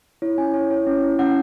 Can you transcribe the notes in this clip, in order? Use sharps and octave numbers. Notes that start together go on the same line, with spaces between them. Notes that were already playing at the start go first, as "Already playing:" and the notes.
E4 C#5
C#4 G#5
E4 C#5
E4 C#5
C#4
E4
C#4 F#5